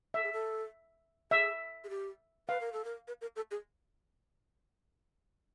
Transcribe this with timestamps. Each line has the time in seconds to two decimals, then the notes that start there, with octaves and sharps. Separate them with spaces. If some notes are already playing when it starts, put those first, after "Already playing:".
0.14 A4 E5
0.23 G#4
0.33 A4
1.31 G#4 E5
1.84 G#4
1.90 G4
2.48 B4 F5
2.61 A#4
2.73 A4
2.85 A#4
3.08 B4
3.21 A#4
3.36 A4
3.51 G#4